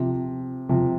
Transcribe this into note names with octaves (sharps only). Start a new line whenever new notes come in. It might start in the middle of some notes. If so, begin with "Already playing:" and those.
Already playing: C3 F3
C3 F3